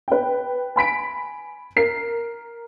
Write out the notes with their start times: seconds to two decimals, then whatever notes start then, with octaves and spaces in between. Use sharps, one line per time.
0.08 B4 G5
0.76 G#5 B5 B6 D7
1.76 A#4 C7